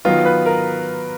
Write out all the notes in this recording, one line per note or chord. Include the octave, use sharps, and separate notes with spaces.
D#3 F#3 B3 F4
B4
A#4